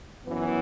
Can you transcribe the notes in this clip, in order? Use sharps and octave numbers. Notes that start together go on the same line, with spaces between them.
F#2 E3 B3